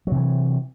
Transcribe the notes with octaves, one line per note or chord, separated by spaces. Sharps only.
C3 E3 F#3